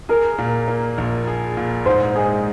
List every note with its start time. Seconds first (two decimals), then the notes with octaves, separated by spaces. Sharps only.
0.09 G#4 A#4
0.38 A#2
0.68 A#3
0.98 A#1
1.27 G#4
1.57 A#2
1.86 G#2 C5
2.15 G#3 G#4